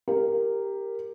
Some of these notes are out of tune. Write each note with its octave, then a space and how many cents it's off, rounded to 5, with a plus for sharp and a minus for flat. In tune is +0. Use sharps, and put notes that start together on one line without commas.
G4 +10 A#4 -5